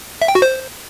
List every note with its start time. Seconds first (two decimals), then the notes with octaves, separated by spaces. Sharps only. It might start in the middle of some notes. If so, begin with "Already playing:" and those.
0.22 E5
0.28 G5
0.35 F#4
0.42 C5